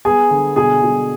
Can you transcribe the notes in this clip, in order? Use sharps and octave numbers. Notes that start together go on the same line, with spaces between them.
B3 G#4 G#5
D3
B2 G#4 G#5
B2